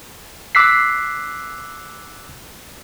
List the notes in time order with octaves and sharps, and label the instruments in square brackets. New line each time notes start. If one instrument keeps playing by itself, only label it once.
[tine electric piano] D6 E6 F#6 B6 C7